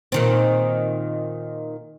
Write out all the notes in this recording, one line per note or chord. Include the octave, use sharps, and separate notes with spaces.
A#2 D#3 C4